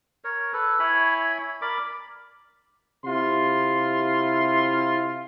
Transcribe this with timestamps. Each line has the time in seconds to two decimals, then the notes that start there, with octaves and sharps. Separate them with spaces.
0.24 A#4 C#5
0.53 A4 B4
0.79 E4 C#5 G#5 B5
1.62 A#4 D5 B5 D6
3.05 C3 E4 F4 C6